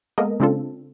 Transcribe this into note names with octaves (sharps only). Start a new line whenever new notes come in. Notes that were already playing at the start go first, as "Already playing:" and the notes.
G#3 A#3 B3 A4 A#4 D#5
C#3 G#3 C4 D4 F4 A4